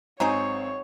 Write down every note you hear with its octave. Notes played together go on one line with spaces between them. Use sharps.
G#1 F#3 C4 D#4 G#4 C#5 C#6